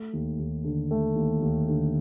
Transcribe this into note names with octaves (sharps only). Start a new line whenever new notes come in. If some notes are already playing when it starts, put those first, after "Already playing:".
Already playing: A3
D#2
D#2
D3
A3
D#2
D#2
D3